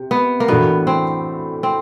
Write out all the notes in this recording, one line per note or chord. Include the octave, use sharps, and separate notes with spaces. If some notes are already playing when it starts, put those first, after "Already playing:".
Already playing: C3
B3
A#3
A2 E3 A3 B3 D4 F#4
C4
C4